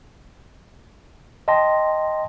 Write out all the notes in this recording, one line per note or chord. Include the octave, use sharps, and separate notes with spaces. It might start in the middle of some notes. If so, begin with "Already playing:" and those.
D#5 G5 A5 C6 A#6